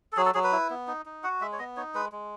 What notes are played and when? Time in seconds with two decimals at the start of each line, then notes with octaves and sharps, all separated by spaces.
0.13 A4
0.17 F#3 G#4
0.26 A4
0.34 F#3 G#4
0.44 B4
0.52 E4
0.70 B3
0.87 D#4
1.06 D#4
1.23 F#4 F#5
1.41 G#3 E5
1.52 C#5
1.59 B3 D#5
1.77 D#4 C#5
1.94 G#3 B4
2.12 G#3